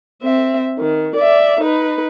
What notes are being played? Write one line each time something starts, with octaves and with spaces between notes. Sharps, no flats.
C4 E5
D#3
D5 E5
D#4 B4